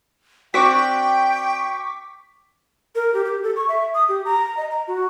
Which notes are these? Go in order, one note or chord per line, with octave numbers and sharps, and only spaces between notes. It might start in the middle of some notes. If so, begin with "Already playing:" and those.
C4 D4 F#4 G5 C#6 D6 B6
A#4
G4
G4
A4
C#6
E5
D#6
G4
A#5
D#5
A#5
F#4